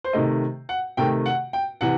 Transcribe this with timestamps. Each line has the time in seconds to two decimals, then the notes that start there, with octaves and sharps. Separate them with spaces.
0.04 C5
0.13 C3 D#3 A3 D#5
0.69 F#5
0.97 C3 D#3 A3 G5
1.26 F#5
1.53 G5
1.81 C3 E3 F#5